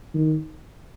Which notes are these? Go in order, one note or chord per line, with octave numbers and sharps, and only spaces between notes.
D#3